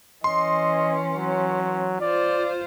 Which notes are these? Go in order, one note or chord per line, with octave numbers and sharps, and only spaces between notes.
E3 C#4 D#5 C6
F#3
F4 C5 D5